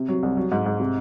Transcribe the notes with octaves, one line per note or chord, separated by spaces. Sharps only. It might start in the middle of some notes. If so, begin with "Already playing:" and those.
Already playing: C3
F#3
C2
F#3
G#2
G#2
C3